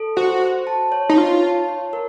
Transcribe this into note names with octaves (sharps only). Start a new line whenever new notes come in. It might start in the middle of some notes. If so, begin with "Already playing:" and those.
Already playing: A4
F#4 C5
C5
A5
C#5
D#4
F4 C#5
A5
C#5
A#4